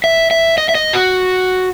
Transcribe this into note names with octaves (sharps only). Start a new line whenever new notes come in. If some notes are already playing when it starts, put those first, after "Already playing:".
E5
E5
D#5
E5
D#5
F#4